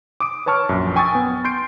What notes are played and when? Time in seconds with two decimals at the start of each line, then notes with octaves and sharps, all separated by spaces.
0.20 D6 D#6 D7
0.46 B4 C#5 A5 C#6 F6
0.69 A#1 F#2
0.96 G5 G#5 C#6 D#6 E6 A6
1.15 B3
1.45 C6 G6 C7 D7